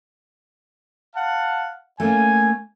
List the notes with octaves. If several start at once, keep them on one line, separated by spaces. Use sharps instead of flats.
F5 F#5 A5
A3 A#3 C#4 G#5